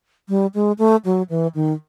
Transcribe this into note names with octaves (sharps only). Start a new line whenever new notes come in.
G3
G#3
A3
F#3
E3
D#3